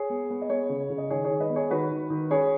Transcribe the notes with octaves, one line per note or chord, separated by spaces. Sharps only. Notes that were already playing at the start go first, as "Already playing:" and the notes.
Already playing: G#4 C#5
B3
B3
D#5
B3 G#4 C#5
C#3
C#3
D#5
D#3 G#4 C#5
G#4 C#5
D#3
B4 D#5
B3
G#4 C#5
D#3 F#4 B4
D#3
D#3
C#4 G#4 C#5